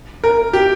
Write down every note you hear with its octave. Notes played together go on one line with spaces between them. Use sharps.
A#4
G4